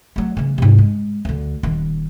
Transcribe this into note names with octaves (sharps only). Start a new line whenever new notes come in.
F#3 A3
C#3 E3
G#2 C3
G#3
D2 D3
D#1 D#3